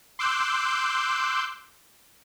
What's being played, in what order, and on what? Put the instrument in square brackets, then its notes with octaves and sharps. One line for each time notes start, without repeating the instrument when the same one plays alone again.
[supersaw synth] C6 D6 E6 F#6 G6